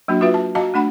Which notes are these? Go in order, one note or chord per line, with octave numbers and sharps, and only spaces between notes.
F#3 A#3 D4 F#4
F4 F#4 B4 E5
A5
F#4 D#5 F5 A5 A#5
A3 D4 F#5 B5